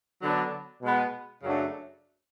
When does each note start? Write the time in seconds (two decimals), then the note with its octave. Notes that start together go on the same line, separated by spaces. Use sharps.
0.21 D3 F#3 B3 D4
0.82 B2 G#3 B3
1.42 F#2 C#3 F#3 A3 D4